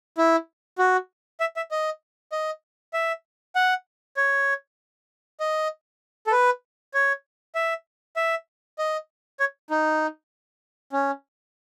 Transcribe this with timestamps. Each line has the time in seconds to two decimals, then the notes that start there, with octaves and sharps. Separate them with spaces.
0.18 E4
0.78 F#4
1.40 E5
1.56 E5
1.71 D#5
2.32 D#5
2.94 E5
3.56 F#5
4.17 C#5
5.40 D#5
6.27 A4
6.32 B4
6.94 C#5
7.55 E5
8.16 E5
8.79 D#5
9.40 C#5
9.70 D#4
10.93 C#4